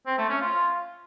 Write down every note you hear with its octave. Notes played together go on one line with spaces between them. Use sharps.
C4
A3
C#4
F4